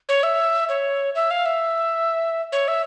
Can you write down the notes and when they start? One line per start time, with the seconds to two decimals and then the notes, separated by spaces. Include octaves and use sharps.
0.09 C#5
0.23 E5
0.69 C#5
1.15 E5
1.31 F5
1.45 E5
2.52 C#5
2.68 E5